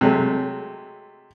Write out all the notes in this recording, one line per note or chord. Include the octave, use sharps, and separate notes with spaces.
C3 F#3 G#3 A3